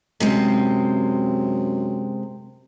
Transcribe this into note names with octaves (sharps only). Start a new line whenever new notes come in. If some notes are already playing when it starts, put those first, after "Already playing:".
F#2 C3 G#3 C4